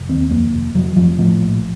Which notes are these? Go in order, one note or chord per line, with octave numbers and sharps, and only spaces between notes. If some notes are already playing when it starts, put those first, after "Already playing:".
Already playing: F1
D#2 C4
F2 A#3
F1
F1 F#3
F1 F3
A2 F3
A#1